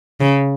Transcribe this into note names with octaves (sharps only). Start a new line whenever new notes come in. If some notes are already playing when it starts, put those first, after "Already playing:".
C#3